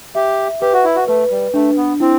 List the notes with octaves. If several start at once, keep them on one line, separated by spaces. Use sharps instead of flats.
G4 E5
G4 B4
F#4
E4
F#4
A3 B4
G3
A3 D4
B3
C4 E4